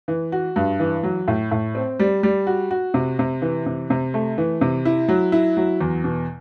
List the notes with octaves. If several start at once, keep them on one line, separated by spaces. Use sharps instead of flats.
E3
F#4
G2
E3
F#3
A2
A2
C4
G3
G3
F#4
F#4
C3
C3
E3
C3
C3
A3
E3
C3
E4
F#3
E4
F#3
E2
B2